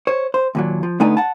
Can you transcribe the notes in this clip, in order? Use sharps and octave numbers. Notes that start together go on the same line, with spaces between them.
C5 C#5
C5
D#2 A#2 F#3
F3
D3 A3 B3 D#4 D5 G#5
F#5 A5